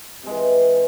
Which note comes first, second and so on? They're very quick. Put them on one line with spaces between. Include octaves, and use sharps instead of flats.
C3 G#3 E3